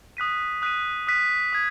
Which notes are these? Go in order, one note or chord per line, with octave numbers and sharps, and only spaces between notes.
D#6 F#6 B6 D#7
D#6 F#6 B6 D#7
D#6 F#6 B6 D#7
D#6 G#6